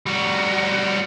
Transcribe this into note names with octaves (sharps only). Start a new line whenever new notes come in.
G3 F#4